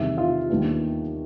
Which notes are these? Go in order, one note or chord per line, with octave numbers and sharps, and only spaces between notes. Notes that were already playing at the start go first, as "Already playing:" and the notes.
Already playing: E2 C3 D#3 G3 E5
F4 F5
D#2 D#3 G3 B3 D4